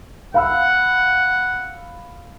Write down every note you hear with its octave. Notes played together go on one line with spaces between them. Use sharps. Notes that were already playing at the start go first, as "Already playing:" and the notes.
F5 F#5 B5 E6